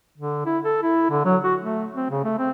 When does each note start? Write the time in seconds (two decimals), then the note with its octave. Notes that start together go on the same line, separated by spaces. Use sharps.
0.18 D3
0.46 E4
0.64 A4
0.83 E4
1.10 D3
1.25 F#3
1.44 F#4
1.61 A3
1.95 C4
2.10 C#3
2.24 A3
2.38 C4